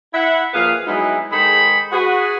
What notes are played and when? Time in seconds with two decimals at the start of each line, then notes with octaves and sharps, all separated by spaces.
0.14 E4 E5 F#5
0.54 A#2 F3 G#4 B4 F5
0.86 F#3 G#3 B3 D#4 E4
1.32 D#3 G#3 G#4 A4 C5 B5
1.92 F#4 G#4 B4